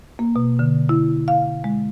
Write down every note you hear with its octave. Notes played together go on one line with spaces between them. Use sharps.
A#3
B2
D3
E4
F5
G#3